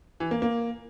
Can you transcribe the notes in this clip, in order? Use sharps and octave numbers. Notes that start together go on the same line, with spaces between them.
E3
A#3
A#3